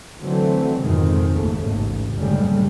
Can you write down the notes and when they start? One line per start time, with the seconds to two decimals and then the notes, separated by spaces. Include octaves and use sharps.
0.20 D3 E3 F#3 A3 C4
0.82 F2 G#2 B2 D#3 G#3 C4
1.30 G#1 D#2 G#2 C#3 A3
1.63 A1 G#2
2.15 F#1 D#2 A2 D3 G3 G#3